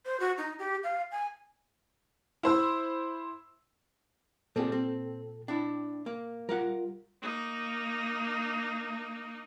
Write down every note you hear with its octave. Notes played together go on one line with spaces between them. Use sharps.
C5
F#4
D#4
G4
F5
G#5
E4 C5 E6
A#2 G3 C4 G#4 A4 G5
C4
D4 E4 G5
A#3
G3 F4 A#4 F5 F#5
A#3 D#4